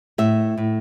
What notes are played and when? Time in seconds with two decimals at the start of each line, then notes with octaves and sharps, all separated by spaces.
0.18 A2 E5
0.58 A2